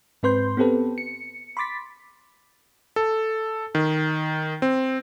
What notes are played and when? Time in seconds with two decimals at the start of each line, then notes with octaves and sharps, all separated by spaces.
0.23 G#2 C4 B4 C6 G6
0.57 B3 C4 G4 A4 B4
0.98 C#7
1.57 B5 C6 D6 A6 B6
2.96 A4
3.75 D#3
4.62 C4